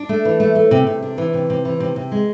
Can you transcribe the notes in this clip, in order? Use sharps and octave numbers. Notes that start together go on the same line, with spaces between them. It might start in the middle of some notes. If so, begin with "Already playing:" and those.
Already playing: D4
A3
E3
A3
A3
C3
C3
D4
E3
C3
C3
E3
C3
C3
G#3